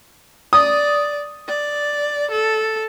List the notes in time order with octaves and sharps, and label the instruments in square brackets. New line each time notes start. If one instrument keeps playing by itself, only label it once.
[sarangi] D5 [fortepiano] D#6
[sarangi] D5
A4